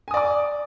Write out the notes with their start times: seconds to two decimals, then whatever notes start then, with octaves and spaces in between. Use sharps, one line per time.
0.08 G#5
0.11 D#6
0.14 D5
0.17 D6